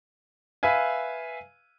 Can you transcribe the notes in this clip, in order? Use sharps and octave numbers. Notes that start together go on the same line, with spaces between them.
B4 E5 F5 G#5